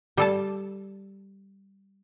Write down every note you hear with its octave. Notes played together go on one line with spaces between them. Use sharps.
G3 A4 A5